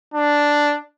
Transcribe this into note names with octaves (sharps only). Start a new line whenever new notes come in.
D4